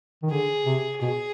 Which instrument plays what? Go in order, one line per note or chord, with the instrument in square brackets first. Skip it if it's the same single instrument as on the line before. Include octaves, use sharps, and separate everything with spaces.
[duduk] D#3
[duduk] D3 [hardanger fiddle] G#4
[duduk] C3
[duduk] B2 [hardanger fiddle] G#4